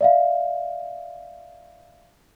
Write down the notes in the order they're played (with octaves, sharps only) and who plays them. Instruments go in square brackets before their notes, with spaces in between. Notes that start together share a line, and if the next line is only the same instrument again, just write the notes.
[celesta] D5 E5 F5